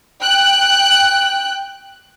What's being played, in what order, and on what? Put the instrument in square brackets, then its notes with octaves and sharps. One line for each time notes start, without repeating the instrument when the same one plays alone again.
[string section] G5 F#6